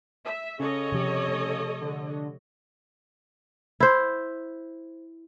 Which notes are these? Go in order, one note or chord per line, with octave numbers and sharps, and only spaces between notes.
E5
C#3 A4 C#5 D#5
C3 F3 G4
A3
D3
E4 C5